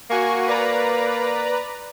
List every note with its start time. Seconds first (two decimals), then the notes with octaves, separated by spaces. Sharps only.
0.10 A#3 F#4 G#5 C#6
0.47 B4 D5 A#5